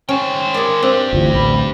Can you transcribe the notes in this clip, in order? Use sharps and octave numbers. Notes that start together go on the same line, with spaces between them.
G#3 C#4 G5
G#4 A#4 D5
C4 D4 G4
G1 D2 E3 F4
A1 D2 B5